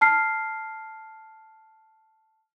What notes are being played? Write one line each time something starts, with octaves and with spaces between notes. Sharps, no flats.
A5 F6 C7